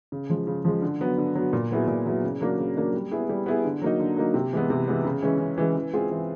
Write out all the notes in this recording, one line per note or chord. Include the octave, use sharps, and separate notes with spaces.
C#3
F3 G#3
C#3
F3 G#3
D3
F#3 B3
D3
F#3 B3
A#2
F#3 B3 E4 G#4
A#2
F#3 B3 E4 G#4
C#3
F#3 A#3 D4
C#3
F#3 A#3 D4
G3
B3 E4 G#4
G3
B3 E4 G#4
D3
F#3 A#3 D#4
D3
F#3 A#3 D#4
C3
E3 G#3 B3
C3
E3 G#3 B3
C#3
E3 G#3 C#4
C#3
E3 G#3 C#4
E3
G#3 C4 F4 G#4
E3